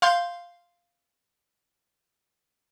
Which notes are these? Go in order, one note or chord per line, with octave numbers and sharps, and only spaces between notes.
F5 C6 G6